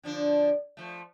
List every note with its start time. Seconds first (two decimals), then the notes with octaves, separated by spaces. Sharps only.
0.03 D3 F3 D4
0.77 F3 A3